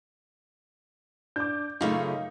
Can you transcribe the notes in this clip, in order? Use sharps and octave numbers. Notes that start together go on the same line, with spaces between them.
D4 D6 G6
F#2 C#3 A3 A#3 D#4 F4